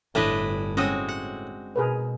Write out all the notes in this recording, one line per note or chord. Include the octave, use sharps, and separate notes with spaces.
G1 A2 D4 B4 D#5
G#3 C4 C#4 F#4 D#6
F#5
B2 G#4 A#4 B4